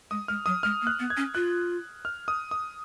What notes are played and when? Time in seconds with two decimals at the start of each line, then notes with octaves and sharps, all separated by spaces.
0.11 G#3 D#6
0.28 G#3 F6
0.46 F#3 D#6
0.63 G#3 F6
0.82 A#3
0.87 F#6
0.99 B3
1.10 G#6
1.17 C#4
1.35 F4 F#6
2.05 F6
2.28 D#6
2.51 D#6